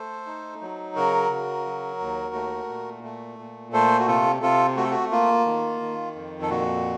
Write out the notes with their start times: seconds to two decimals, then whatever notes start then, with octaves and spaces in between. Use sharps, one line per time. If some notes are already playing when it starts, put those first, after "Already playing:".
Already playing: A3 A4 C5
0.26 D#4
0.61 F#3
0.96 C#3 F#4 A#4
1.31 C#3
1.66 F#3
2.00 D#2
2.35 A3
2.69 A#2
3.04 A3
3.39 A#2
3.73 A3 A4 C5
3.99 F#4
4.07 C3 F4 A4
4.42 C3 F4 A4
4.77 A3 F#4
4.84 A4
4.91 F#4
5.11 A#3 F4
5.46 D#3
5.81 D#3
6.15 F2
6.42 A4
6.49 A#2 F#4